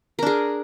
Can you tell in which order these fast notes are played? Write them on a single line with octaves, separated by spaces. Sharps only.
A#4 D4 G#4